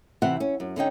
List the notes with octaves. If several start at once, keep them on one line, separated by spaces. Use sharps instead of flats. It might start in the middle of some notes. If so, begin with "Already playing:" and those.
C3 E3 C4 E5 F#5
C#4
F#2
D3 C#4 D#4 G5